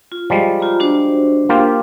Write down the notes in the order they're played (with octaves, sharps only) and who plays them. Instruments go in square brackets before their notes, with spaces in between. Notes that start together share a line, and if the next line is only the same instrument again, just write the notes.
[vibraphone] F4
[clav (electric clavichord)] F3 G3 G#3
[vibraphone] F4 A#5
D4 F#4 C5
[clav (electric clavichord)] A#3 F4 G4